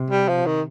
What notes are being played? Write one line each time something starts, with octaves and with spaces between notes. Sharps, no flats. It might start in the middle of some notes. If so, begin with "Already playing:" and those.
Already playing: C3
G3
F3
D#3